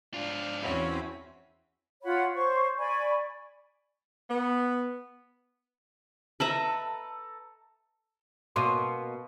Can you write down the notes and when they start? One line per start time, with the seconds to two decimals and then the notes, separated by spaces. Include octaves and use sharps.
0.14 G#2 D4 F4 F5
0.63 E2 C4 C#4 E4 F#4 B5
2.03 F4 C#5 F#5 B5
2.35 C5 C#5 C#6
2.78 D5 G#5 B5 C#6
4.30 B3
6.40 A4 B4 D#5 E5 A#5
8.56 B2 A#3 C#4 C6 D6 D#7